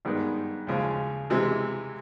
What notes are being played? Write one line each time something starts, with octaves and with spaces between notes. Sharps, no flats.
G2 D#3 G#3 B3
D#2 C#3 F3 G#3
C3 E3 G#3